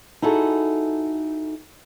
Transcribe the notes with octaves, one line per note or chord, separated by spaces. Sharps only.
D#4 E4 F#4 G#4 A4